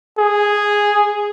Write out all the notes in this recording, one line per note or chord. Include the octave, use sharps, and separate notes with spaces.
G#4